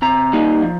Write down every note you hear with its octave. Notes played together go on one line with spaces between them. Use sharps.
C3 A#5
G3 A#3 D#4
F3